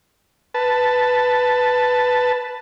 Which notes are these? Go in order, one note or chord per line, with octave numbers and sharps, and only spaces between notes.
B4 A5